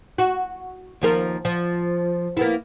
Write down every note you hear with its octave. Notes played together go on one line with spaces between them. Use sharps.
F#4
D#2 F3 A#4
F3
A#3 B3 E4